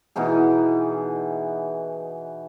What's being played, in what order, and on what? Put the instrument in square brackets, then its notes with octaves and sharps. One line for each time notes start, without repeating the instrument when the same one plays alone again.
[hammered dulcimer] B2 E3 D#4 G#4